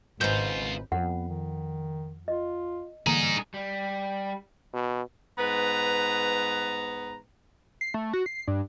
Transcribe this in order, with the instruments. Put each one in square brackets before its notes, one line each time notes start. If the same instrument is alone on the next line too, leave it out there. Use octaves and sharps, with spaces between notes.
[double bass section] G#1 [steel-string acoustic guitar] G#2 B4 [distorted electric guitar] C#3 F4 [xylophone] G6
[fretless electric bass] F2 [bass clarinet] B3 [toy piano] F#5
[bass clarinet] D#3
[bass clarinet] F4 [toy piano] D#5
[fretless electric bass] D3 E3 A#3 [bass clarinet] G3 [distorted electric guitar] D#4 G#4 [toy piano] A#5
[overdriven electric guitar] G3
[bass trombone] B2
[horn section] G#2 B3 B4 A#5
[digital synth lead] C7
A3
F#4
C7
G2